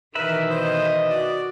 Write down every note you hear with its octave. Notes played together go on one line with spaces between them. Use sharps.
B2 D#3 E3 A#4 B4 E5 B5
C5 D#5
F#4 D5